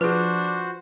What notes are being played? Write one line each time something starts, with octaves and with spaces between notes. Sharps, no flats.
F3 D4 F#4 G#4 B4 C5